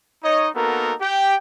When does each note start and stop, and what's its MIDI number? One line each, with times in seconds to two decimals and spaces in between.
0.23 0.49 63
0.23 0.49 73
0.23 0.49 75
0.55 0.93 58
0.55 0.93 59
0.55 0.93 63
0.55 0.93 66
0.55 0.93 69
0.55 0.93 70
1.01 1.35 67
1.01 1.35 79